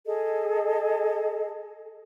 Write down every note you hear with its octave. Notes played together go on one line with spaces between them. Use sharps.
G#4 A4 D#5